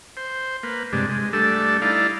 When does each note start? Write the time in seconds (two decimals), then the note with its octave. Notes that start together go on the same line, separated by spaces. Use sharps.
0.17 C5
0.63 A#3 B4
0.93 G2 C3 G#3 D4
1.09 G#3
1.33 G3 A3 D4 A4
1.82 D#4 E4 D5 F5